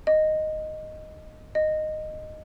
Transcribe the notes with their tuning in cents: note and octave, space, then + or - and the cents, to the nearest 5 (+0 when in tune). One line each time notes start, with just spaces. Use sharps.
D#5 -5
D#5 -10